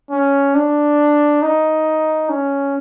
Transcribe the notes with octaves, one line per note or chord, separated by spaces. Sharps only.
C#4
D4
D#4
C#4